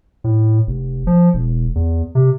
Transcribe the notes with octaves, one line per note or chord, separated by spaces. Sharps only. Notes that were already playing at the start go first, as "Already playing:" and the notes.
A2
F1
F3
E1
E2
C3